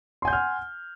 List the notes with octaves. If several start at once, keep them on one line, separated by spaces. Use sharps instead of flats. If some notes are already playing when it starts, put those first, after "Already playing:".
F#5 G#5 C6 F6 G6